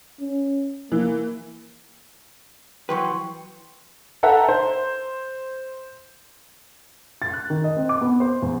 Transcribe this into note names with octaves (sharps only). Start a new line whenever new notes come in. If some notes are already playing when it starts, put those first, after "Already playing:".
C#4
E3 A#3
E3 F#3 B4 G5 C6 C#6
A4 B4 E5 F#5 G5 A#5
C5
A6
F#6
D#3
D#5
C4
D6
B3
C5
E2